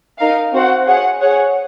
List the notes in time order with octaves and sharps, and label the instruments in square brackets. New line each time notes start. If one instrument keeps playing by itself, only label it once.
[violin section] D#4 A#4 F5
C4 F#4 C5 F#5
G#4 C#5 F#5
G#4 C#5 F#5